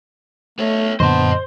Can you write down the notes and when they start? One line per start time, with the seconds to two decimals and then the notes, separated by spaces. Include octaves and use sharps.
0.59 A3 B3 C#5
1.00 F#2 A#2 D3 B3 C5 D#5 A5